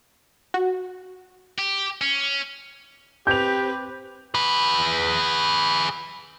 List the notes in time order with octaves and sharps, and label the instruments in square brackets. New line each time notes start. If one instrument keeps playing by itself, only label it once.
[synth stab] F#4
[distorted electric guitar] G4
C#4
[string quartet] C4 B4 [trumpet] G4 [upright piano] G6 F7
[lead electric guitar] G#4 B4